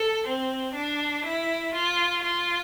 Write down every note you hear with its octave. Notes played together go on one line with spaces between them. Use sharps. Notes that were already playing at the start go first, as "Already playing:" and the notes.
Already playing: A4
C4
D4
E4
F4
F4